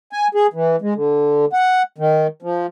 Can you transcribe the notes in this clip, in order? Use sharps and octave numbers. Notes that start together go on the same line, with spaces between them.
G#5
G#4
E3
G#3
D3
F#5
D#3
F3